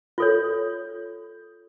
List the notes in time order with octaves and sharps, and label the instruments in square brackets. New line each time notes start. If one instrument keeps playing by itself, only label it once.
[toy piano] F4 A4 C#5